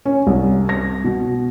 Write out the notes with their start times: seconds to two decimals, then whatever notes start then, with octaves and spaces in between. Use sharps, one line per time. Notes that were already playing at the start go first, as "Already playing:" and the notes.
0.05 C#4
0.27 C2
0.69 A#6
1.04 B2